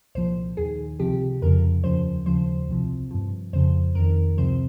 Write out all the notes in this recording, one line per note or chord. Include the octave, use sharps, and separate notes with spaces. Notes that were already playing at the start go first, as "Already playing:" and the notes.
C2 A#2 F3 C5
D#2 D#3 G#4
C#2 C3 F3 G4
F2 C#3 F3 A#4
D#2 C#3 F3 C5
D#2 C#3 F3 C5
C2 C3 F3
G2 F3
F2 C#3 F3 C5
F2 D#3 A#4
C#2 C3 F3 C5